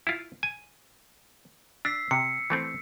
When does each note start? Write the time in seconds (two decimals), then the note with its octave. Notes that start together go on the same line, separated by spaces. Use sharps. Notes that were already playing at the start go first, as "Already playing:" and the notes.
0.07 E4 F4
0.43 G#5
1.85 D4 E6 B6 C7
2.11 C3 C#7
2.50 E3 A3 C4